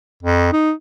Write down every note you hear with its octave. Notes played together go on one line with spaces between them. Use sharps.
F2
D#4